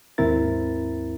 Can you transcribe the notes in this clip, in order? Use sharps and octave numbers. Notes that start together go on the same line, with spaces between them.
D#2 G#2 C4 E4 A#4 A6